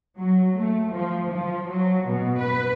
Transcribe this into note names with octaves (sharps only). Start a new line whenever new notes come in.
F#3
A3
F3
F3
F#3
B2
B4